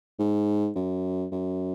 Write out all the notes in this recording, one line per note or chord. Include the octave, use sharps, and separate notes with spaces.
G#2
F#2
F#2